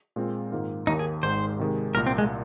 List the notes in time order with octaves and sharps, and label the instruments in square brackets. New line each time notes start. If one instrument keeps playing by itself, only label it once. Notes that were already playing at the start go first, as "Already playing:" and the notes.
[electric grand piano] A#2 G#3 C4 F4
G#2 D#3 A#3 F4
[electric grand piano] D#2 D#3 A#3 [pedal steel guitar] D#4
[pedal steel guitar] G#4
[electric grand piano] G#1 G#2 G#3 [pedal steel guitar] C5
[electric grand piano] C3 D#3 G#3
[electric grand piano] C2 A#2 A#3 [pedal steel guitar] A#4
[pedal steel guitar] C4
G#3